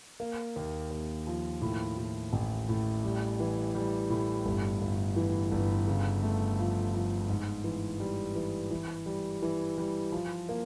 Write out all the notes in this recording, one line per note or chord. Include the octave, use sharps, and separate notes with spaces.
A#3
D#2
D#2
F3
A2
A2
A1
A2
G3
E3
G3
A2
G1
G1
E3
G1
C#3
A3
F3
F3
G#2
E3
G3
E3
E3
G3
E3
G3
F3
A#3